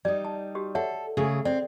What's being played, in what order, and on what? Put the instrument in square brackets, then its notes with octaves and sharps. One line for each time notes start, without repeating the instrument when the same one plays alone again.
[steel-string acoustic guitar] G3 D#4 [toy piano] D5
[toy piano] A5
F#4 G4
[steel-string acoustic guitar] A4 [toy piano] C#5 E5 F#5
[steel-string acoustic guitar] C#3 A3 G#4
[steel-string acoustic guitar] C4 [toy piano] D5